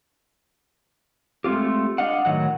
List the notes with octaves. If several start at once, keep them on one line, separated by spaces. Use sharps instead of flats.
G#3 A3 C4 F4 G4
D4 D#5 F5 F#5
A2 D#3 F#3 F#5